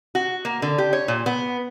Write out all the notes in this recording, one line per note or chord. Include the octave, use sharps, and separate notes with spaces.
F#4
A#3
D3
G4
C#5
A#2
B3